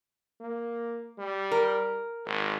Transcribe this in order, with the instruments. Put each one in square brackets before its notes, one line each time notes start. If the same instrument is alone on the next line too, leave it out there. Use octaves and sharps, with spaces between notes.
[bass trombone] A#3
G3
[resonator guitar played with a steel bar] A#4
[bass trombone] G#1